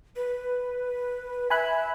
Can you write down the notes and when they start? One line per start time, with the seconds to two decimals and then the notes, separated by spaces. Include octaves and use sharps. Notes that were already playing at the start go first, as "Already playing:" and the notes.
0.16 B4
1.50 E5 G#5 B5 F#6